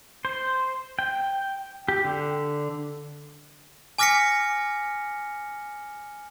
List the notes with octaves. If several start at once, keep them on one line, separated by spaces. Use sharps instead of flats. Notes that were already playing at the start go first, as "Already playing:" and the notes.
C5
G5
G4
D3
G#5 D6 F6 A#6 B6 C#7